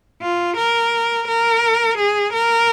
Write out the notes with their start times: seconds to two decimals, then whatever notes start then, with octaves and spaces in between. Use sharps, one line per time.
0.22 F4
0.57 A#4
1.28 A#4
1.98 G#4
2.33 A#4